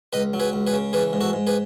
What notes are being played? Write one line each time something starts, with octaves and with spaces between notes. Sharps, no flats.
C#2 B4 D#5
F#3
G#4 B4
C#2
G#4 B4
C#3
E3 G#4 B4
G#2
F#4 A4
G#2
G#4 B4